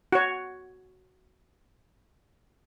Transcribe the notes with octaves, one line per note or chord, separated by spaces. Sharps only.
F#4 C#5